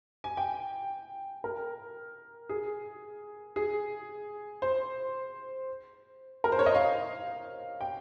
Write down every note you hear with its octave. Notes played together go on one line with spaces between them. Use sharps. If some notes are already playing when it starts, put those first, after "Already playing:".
G#5
G5
A#4
G#4
G#4
C5
A#4
C5
C#5
D#5
F5
G5